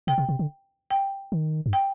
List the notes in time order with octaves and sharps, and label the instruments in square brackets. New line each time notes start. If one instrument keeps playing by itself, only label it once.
[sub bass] C3 [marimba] G5
[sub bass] C3
C3
D3
[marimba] G5
[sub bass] D#3
G2
[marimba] G5